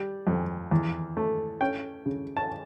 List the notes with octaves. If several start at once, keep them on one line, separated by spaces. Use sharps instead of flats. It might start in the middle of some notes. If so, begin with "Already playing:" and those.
Already playing: G3
F2
E2
A3
C#4 G5
C#3
A5